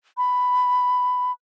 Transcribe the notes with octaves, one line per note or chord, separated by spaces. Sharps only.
B5